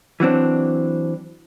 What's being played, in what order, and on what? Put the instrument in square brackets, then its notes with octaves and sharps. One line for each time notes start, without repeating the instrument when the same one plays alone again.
[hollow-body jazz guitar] E3 F#3 C4 D4